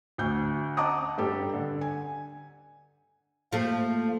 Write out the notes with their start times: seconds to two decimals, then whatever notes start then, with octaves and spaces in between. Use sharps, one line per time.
0.18 D2 G6
0.77 D#5 F#5 A5 A#5 D6 D#6
1.18 G2 G4 A4
1.54 D3
1.81 G#5
3.53 F3 A3 A#3